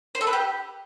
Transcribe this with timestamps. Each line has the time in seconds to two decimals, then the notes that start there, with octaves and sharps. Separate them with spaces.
0.15 C5
0.21 A4
0.27 B4
0.33 G4